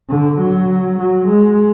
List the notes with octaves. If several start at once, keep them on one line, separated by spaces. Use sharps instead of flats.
D3
F#3
F#3
G#3